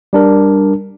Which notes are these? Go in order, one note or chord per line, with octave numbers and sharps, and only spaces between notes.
G3 D4 A#4